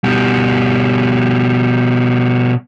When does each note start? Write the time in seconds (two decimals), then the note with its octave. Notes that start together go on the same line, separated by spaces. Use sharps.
0.04 B2 G3